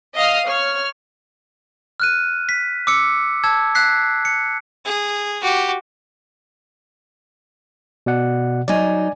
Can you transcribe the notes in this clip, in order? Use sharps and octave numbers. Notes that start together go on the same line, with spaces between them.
D#5 F5 D#6 F6
C#5 F6
F6 F#6 D#7
B6
D6 E6 C#7
A5 E6 G#6
F#6 B6 C7
C#7
G#4
F#4 G4
B2 D5 F#5
F#3 D#4 D5 G#5